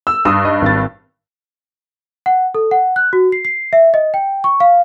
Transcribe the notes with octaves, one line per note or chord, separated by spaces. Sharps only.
E6
G2 D#6 E6
D#5
G#1 A6
F#5
A4
F#5
F#6
F#4
C7
C7
E5
D#5
G5
C#6
F5